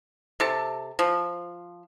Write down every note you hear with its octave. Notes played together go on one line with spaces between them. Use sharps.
C3 A4 A5
F3